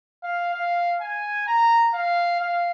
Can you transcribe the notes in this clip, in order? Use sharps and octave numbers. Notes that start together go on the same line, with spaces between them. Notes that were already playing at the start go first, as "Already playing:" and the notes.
F5
F5
G#5
A#5
F5
F5